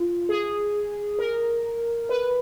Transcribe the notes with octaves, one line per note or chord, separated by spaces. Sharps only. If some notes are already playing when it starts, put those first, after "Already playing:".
Already playing: F4
G#4
A#4
B4